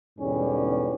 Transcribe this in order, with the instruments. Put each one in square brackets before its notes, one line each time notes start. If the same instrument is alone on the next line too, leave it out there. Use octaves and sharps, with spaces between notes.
[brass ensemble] E2 G#2 B2 D3 G3 C#4